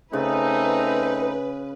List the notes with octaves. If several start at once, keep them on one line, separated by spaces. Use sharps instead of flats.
C#3 A3 C4 D#4 B4